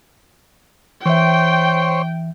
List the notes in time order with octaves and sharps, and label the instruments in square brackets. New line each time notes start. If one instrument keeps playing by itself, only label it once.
[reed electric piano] E3 E5 [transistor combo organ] C5 C#5 [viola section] G5